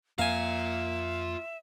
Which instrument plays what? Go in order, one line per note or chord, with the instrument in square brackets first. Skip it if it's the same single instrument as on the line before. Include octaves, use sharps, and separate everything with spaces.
[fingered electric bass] F2 A#3 [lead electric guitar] F4 A#5 [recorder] E5 [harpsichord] F5 G#5